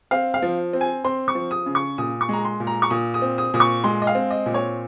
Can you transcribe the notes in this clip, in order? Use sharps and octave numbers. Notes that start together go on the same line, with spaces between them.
C4 F5
F5
F3
C4
G#5
C4 C6
C#6
F3
D#6
C#3
C#6
A#2 D#6
C#6
G#3 A#5
C6
A#2
A#5
C#6
A#2 D#6
D#6
C4
D#6
A#2 D#6
C#6
G#3 C6
D#5
F5
C4
D#5
A#2
C#5